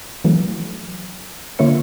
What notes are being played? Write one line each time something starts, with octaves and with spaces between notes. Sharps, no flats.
E3 F#3 A3
D3 A#3 F4 C#5 E5 C#7